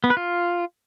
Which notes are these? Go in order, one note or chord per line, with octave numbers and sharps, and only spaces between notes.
B3
B4
F4